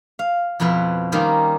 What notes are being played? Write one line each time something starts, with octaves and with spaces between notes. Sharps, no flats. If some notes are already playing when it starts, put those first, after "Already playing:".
F5
F2 B2 F3 E4 B4 B5
D#3 G3 A#3 C4 C#4 D#4